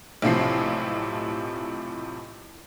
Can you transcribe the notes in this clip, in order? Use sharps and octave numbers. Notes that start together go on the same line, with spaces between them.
B1 A2 C3 F3 C7